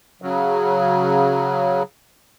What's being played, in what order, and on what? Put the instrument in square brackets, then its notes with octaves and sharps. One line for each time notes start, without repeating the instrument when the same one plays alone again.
[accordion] C#3 F#3